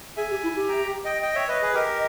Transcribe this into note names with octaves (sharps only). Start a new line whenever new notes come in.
G#4 E5 G#5
G4
E4
G4
G5 A#5
D#5 G5
D#5 G5
C#5 E5
B4 D#5
G#4 B4
G4 A#4 D#5